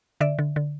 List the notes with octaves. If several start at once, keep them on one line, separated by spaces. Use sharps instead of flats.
D3 D5 E5
D3
D3